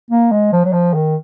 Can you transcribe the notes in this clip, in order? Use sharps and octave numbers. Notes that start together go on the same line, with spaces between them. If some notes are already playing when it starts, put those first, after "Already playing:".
A#3
G#3
F3
F#3
F3
D#3